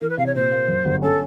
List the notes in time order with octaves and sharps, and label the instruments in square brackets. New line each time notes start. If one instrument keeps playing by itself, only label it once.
[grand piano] E3 [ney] A#4
[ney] B4
[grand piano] C3 [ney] F5
[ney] C#5
[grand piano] A#2 [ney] C5
[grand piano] A#3
F#2
G1
[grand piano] C#4 [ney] A4